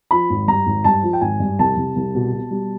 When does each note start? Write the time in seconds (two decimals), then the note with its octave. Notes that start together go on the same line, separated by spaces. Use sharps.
0.11 F3 B5
0.30 G#1
0.48 G2 A#5
0.67 G#1
0.84 G2 A5
1.03 F3
1.13 G5
1.21 G#1 G#5
1.40 G2
1.59 C2 A5
1.77 C2
1.96 C2
2.15 B2
2.33 B2
2.51 G3